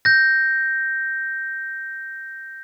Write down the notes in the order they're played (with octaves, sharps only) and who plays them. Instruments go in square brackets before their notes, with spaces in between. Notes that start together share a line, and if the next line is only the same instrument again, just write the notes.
[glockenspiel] G6 A#6